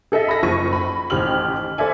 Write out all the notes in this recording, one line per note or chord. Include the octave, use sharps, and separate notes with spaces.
G#4 A4 D#5 E5
B5 A#6
F#1 F3 C#6 A#6 D#7
B5
A1 D#3 G4 C5 F6 F#7
A4 C5 D5 E5 G#5